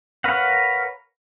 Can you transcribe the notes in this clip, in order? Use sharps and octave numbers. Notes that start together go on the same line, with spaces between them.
A#4 B4 C#5 F5 F#5